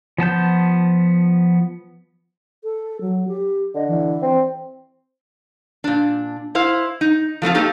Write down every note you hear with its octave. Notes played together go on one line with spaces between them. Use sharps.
F3 B3 A5 G6
A4
F#3
G4
D3 D#5
E3
C4
A#2 D4
E4 C5 F5
D#4
F3 A3 C4 F4
A3 A#3 D#4 G4 A4